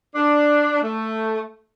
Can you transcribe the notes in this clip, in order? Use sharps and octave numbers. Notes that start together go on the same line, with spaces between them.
D4
A3